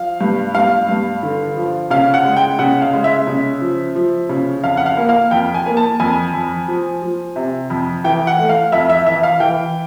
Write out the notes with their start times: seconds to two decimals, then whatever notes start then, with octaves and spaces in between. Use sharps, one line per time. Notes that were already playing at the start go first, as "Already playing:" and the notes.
Already playing: F3 F5
0.21 G2
0.55 G2 F5
0.89 G2
1.23 D3
1.56 F3
1.91 C#3 F5
2.14 F#5
2.25 G#3
2.37 G5
2.59 C#3 F#5
2.82 F5
2.93 G#3
3.04 E5
3.27 C#3
3.61 F3
3.95 F3
4.29 C#3
4.64 F2 F5
4.77 F#5
4.86 F5
4.97 A#3
5.09 F5
5.31 F2 G5
5.54 G#5
5.66 A#3
5.77 A5
6.00 F2 G#5
6.34 F2
6.68 F3
7.02 F3
7.36 C3
7.70 F2
8.04 E3 G5
8.27 F#5
8.38 A3
8.49 F5
8.72 F2 E5
8.89 E5
9.06 E3 E5
9.23 F5
9.40 E3 G5